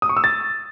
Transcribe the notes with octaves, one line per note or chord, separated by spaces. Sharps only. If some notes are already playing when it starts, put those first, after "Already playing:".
D#6
C#6
E6
A6